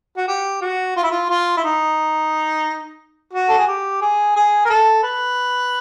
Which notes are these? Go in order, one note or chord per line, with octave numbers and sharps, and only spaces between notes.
F#4
G4
F#4
F4
E4
F4
F4
E4
D#4
F#4
A4
G#4
G4
G#4
G#4
A#4
A4
B4